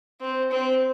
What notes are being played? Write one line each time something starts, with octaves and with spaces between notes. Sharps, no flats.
C4
C4